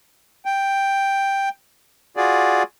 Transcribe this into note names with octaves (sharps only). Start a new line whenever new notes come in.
G5
F4 F#4 G#4 D5